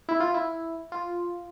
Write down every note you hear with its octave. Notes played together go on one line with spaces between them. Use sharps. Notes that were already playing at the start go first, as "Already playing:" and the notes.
E4
F4
E4
F4